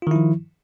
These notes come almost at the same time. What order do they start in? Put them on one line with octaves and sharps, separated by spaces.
F4 D#3 E4 F3